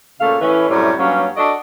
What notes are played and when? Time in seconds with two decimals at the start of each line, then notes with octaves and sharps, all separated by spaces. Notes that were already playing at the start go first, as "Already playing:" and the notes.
0.21 A#2 C#3 A3 A4 F5
0.41 A2 E3 C#4 B4
0.70 F#2 A2 C3 G3
0.99 G2 F#3 A#3 C#4
1.37 D4 F#4 A4 D5 D#5